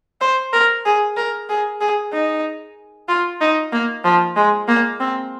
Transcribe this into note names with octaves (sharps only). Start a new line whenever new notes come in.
C5
A#4
G#4
A#4
G#4
G#4
D#4
F4
D#4
A#3
F3
G#3
A#3
C4